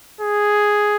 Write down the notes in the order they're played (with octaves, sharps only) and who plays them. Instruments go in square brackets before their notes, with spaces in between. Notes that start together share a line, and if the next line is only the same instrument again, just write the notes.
[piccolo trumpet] G#4